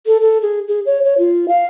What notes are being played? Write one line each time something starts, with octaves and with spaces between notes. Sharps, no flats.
A4
A4
G#4
G#4
C#5
C#5
F4
F5